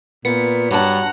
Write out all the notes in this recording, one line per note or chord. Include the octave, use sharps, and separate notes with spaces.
A#2 B3 C#7
G2 F#3 F#5 A5 A#5